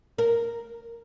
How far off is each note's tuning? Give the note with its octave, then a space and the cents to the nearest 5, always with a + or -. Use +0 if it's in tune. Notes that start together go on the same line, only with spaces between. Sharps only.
A#4 +0